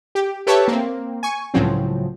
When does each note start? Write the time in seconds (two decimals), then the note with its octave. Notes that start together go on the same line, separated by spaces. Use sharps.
0.15 G4
0.47 G4 A4 B4 C#5 E5 A5
0.68 A#3 C4
1.23 G#5 C#6
1.54 C#2 A2 C#3 F3 F#3 C4